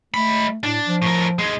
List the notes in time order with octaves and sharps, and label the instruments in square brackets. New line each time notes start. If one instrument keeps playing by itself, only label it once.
[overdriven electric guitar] G#3 B5 [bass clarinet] A3
[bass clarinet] A2 [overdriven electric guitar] D4
[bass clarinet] F3
[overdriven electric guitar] A2 A#4
D#2 G#3